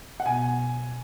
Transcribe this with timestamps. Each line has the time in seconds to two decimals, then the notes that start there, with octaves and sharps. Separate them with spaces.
0.20 F#5
0.25 B2 G#5